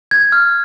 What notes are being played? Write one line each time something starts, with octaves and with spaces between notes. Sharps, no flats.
G#6
F6